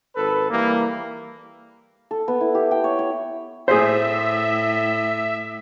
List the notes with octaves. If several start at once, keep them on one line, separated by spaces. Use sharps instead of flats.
G#1 A4 B4
E3 G3 A#3
A4
B3
E4
G4
G5
C#5
C#5
A2 G#4 C5 E5